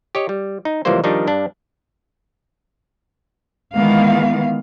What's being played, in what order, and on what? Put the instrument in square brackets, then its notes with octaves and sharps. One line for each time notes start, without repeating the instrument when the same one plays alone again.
[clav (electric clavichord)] G4 C#5 D#5
G3
D#4
C#2 E3 F3 G3 A#3 C5
D#3 F3 G3 D4 D#4
G2 D4
[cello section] D#3 E3 G#3 B3 F5